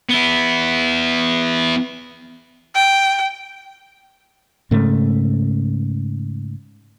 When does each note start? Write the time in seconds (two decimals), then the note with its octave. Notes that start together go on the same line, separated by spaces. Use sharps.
0.09 B3 E4
2.75 G5
4.71 G#2 C#3 A3